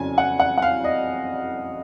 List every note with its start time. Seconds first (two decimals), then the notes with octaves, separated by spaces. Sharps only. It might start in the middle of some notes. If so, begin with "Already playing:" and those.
Already playing: F2 C#3 F#3 G#5
0.18 F#5
0.40 F#5
0.58 F#5
0.62 F5
0.84 D#5